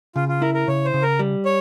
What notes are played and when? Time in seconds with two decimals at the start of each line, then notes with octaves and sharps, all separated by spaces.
0.15 C#3 F4
0.29 F4
0.42 E4 A#4
0.54 A#4
0.68 C#3 C#5
0.85 C5
0.94 C#3
1.02 A#4
1.19 G3
1.45 C#5